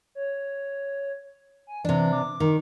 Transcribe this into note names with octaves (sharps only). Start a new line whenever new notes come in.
C#5
G#5
C3 E3 D4
D6
D#3